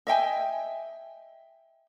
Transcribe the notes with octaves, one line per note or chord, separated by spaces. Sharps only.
D#5 E5 G5 G#5